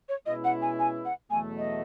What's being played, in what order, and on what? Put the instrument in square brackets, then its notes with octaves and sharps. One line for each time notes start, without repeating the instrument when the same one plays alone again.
[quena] C#5
[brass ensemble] B2 G#3 C#4 E4 B4 [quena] D#5
[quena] F#5
G#5
G#5
F#5
[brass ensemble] E2 B2 F#3 A3 [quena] G#5
[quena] D#5